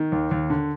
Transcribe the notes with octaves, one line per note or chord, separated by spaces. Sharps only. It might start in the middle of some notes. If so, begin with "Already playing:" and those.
Already playing: D#3
D#2
D#2
D3